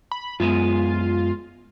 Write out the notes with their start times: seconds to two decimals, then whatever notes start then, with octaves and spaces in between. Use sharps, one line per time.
0.12 B5
0.40 F#2 G#3 B3 F4